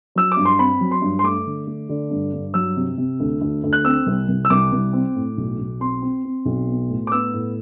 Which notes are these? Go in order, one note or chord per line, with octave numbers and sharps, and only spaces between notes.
F#3 E6
D6
G2
C6
C4 B5
F#3
C6
G2
C6
A3 D6
D3
A3
D3
G2
G2
F#3 E6
C3
C3
D2
D2
D2
F#6
C4 E6
C2
C2
E6
C2 D6
C2
C4
A2
B1
B1
C4 C6
C4
C4
B1
B3
A2
D6
B3 E6
A2